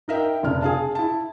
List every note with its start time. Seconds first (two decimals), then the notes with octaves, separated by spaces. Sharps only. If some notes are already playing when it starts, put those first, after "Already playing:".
0.08 D#4 A#4 E5 F5 G5
0.43 F1 C#3 D4 F6
0.62 G#4 F5 A5
0.95 E4 A5